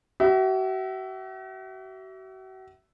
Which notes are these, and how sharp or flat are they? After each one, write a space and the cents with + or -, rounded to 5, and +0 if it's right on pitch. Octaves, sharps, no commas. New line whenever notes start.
F#4 +40 E5 +0